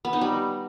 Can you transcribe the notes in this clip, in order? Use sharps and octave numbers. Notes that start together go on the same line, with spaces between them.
B3
D#4
G3